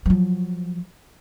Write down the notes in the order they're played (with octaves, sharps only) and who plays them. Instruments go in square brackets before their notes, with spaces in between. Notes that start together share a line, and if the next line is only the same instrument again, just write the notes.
[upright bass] F3 F#3